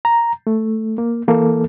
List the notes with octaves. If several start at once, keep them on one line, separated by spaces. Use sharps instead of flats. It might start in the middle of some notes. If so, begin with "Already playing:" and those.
A#5
A3
A#3
E3 A#3 A4